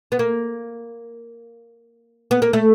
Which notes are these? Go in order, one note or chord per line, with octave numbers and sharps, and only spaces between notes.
B3
A#3
B3
A#3
A3